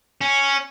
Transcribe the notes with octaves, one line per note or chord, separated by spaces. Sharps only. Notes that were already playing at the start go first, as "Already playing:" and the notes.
C#4